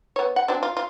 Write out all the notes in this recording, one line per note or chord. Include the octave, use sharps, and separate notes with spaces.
B3 C#5
F#5
F#3 C4 D4
F4
F4